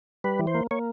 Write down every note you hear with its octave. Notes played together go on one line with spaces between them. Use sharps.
G3 B4
E3
C5
A#3
A#3 C#5